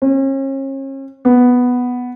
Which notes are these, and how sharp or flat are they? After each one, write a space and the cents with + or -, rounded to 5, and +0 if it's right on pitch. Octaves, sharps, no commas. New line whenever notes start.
C#4 -40
B3 +0